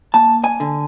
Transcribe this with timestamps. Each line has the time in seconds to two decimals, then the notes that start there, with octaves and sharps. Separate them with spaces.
0.14 A#3 A5
0.44 G#5
0.60 D3